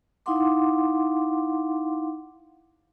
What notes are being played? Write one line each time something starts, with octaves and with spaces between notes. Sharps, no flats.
D#4 E4 F5 F#5 C6 D6